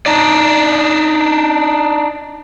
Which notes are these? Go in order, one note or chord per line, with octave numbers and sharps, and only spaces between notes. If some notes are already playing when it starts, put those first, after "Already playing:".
D4 D#4 D5